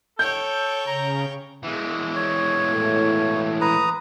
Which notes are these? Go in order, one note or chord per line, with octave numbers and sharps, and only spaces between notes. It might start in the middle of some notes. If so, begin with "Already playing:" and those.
A4 C#5 G5 G6
C#3 A#5
E3 G#3
C#5
A2
B4 A#5 D#6